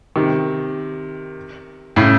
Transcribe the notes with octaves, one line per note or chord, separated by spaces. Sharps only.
C3 D#3
A2 C#3